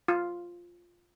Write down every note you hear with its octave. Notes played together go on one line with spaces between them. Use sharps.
F4